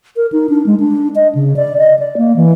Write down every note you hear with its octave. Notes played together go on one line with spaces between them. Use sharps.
A#4
D#4
D4
G#3
D4
D#5
C#3
D5
D#5
D5
A#3
E3